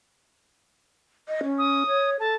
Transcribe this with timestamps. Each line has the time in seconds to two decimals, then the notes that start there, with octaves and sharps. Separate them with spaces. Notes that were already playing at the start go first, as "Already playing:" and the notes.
1.28 D#5
1.44 C#4
1.58 D#6
1.87 C#5
2.20 A4 A5